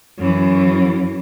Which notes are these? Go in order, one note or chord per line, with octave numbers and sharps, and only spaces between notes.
F#2 E3